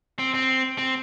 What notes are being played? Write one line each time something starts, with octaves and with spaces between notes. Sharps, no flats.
C4
C4
C4